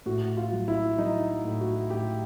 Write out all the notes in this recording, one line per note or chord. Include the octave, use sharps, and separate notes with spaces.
A2 F#4
F4
F#3
E4
F#3 D#4
A2
F#4
A2 G4